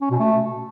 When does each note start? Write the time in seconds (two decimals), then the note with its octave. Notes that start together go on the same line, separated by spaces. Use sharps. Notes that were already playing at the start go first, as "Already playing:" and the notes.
0.01 C#4
0.10 B2
0.19 A3